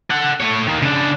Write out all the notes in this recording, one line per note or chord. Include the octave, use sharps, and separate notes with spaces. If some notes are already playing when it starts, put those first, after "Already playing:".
A4 F#5
A3 C#5
D#3 A#3
C#3 D4